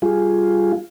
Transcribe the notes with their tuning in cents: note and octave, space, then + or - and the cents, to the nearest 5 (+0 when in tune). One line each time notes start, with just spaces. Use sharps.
G3 +0 F4 +0 G#4 +5